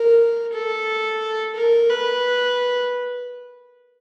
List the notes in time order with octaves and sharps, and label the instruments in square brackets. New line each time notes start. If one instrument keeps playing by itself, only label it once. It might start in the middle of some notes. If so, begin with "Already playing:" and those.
Already playing: [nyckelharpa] A#4
A4
A#4
B4